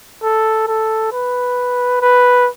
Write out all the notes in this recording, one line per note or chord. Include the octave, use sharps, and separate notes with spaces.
A4
A4
B4
B4